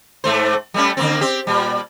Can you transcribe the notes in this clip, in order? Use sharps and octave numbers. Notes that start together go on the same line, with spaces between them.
G#2 A3 C5
G3 A3 C#4
D3 A#3 C4
C4 G4
A#2 G3